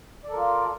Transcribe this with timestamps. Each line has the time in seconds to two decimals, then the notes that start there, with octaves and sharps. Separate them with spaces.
0.24 D5
0.28 A4
0.32 A#4
0.36 F4